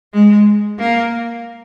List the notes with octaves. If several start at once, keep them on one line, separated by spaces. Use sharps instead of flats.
G#3
A#3